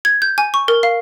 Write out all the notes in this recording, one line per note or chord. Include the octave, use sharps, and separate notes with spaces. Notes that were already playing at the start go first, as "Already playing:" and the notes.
G#6
G6
G#5
C#6
A#4
F5